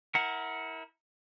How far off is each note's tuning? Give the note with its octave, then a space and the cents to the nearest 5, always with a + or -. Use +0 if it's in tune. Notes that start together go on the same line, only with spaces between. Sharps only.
E4 -30 A#4 +0 F#5 +0